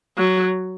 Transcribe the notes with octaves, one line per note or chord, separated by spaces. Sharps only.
F#3